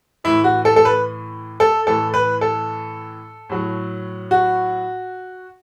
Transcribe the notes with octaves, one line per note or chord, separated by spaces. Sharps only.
A2 E3 E4
F#4
A4
A4
B4
A4
A2 E3 A4
B4
A4
A2 F#3
F#4